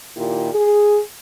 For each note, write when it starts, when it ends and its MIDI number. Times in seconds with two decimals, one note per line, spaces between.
0.16 0.50 46
0.16 0.50 51
0.16 0.50 64
0.16 0.50 67
0.54 1.00 68